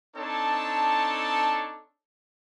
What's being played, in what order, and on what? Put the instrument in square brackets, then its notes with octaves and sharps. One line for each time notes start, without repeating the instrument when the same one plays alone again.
[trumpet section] C4 D4 D#4 A4 C#5 A5